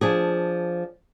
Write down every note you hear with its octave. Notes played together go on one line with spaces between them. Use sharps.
F3 D4 G#4